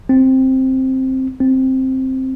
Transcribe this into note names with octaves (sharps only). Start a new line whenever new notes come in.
C4
C4